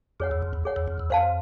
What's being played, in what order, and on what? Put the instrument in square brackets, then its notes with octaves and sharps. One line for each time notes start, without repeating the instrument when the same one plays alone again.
[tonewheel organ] F2 [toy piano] G#4 C#5 F#5
[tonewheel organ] E2
F2
E2
[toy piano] G#4 C#5 F#5
[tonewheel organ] E2
F2
E2
[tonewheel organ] F2 [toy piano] C5 F5 A5